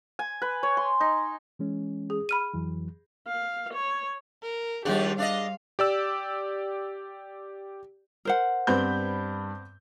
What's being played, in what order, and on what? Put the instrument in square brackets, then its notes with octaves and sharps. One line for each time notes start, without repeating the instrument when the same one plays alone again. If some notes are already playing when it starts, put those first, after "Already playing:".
[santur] G#5
B4
C#5
C6
D#4
[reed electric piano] E3 G#3 C#4
[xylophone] G#4
B5 F6 D#7
[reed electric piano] F2 E3 F#3
[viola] F5
C#5
[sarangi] A#4
[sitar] D#2 F3 D4 [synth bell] G3 G#4 [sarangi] G4
[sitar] D4 D5 D#5 [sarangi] F5
[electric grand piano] G4 D5 E6
[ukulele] A#4 C5 F#5
[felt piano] G2 B5 G6 [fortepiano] B3 C4